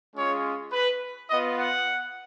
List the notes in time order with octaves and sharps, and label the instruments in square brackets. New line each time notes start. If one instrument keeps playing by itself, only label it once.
[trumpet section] G#3 C#4 F4 C#5
B4
B3 F4 D#5
F#5